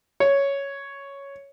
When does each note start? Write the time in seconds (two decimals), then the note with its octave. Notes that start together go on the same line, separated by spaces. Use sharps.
0.20 C#5